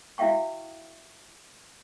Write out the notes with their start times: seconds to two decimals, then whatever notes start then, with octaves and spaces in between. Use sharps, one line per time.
0.18 E4 F#4 E5 F5 G5 C#6